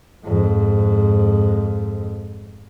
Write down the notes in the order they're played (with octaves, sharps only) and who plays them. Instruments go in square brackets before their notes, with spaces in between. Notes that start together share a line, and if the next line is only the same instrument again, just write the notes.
[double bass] F2 G#2